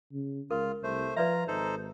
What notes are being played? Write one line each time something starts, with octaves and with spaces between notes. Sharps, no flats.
C#3
C#2 F4 A#4
C2 A3 C5
F3 F4 B4 D5 E5 A#5
G#1 D#4 A4 C5